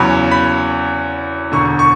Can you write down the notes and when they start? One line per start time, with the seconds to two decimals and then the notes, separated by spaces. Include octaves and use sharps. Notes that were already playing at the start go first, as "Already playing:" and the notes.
Already playing: E2 C#3 F#3 B5
0.31 B5
1.52 E1 D2 D3 C#6
1.79 C#6